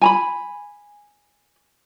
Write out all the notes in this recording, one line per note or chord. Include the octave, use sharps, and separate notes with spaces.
G#5 A#5 B5